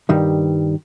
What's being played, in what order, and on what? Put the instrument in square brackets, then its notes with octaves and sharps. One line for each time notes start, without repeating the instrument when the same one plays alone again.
[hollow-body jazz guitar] G2 D#3 G3